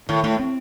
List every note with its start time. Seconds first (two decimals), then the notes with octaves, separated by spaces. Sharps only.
0.09 A2 D#3
0.23 A2 A3
0.39 C4